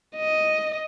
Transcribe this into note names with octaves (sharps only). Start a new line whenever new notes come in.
D#5